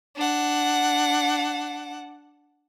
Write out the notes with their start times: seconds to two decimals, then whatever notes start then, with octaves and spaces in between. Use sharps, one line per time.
0.16 D4 F#5